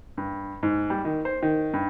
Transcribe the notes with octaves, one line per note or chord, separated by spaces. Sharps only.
G2
G#2
G3
D#3
C5
D#3
G2